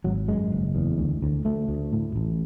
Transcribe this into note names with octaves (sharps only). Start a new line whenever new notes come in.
G#1 F#3
F#2 G#3
F#1
E2
D2
D2
D2 A3
D2
A2
A1